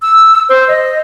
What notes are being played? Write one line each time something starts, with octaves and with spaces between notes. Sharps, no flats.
E6
C5
D#5